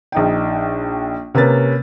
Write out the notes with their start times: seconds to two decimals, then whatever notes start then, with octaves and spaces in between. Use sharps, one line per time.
0.12 A#1 D#4 G5
1.35 C3 A#3 C#4 B4 A6